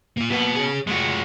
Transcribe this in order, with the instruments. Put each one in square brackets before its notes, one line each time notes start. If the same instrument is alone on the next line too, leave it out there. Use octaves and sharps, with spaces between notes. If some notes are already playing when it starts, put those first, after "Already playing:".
[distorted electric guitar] A#3 F4
[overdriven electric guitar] B2 B3 [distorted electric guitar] A#3 B4
[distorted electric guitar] G#4 C#5
[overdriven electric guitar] G#3 F#4 [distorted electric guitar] A3 F4